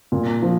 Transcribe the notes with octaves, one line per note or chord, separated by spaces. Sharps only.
A#2
F3